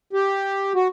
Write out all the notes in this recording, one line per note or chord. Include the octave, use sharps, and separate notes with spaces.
G4
F#4